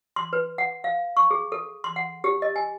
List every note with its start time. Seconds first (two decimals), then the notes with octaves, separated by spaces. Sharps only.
0.16 C6
0.33 B4
0.58 F#5
0.84 F5
1.17 C#6
1.31 G#4
1.52 A4
1.84 C6
1.96 F#5
2.24 G4
2.42 D#5
2.56 G#5